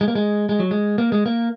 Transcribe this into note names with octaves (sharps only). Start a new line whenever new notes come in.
G#3
A#3
G#3
G#3
F#3
G#3
A#3
G#3
A#3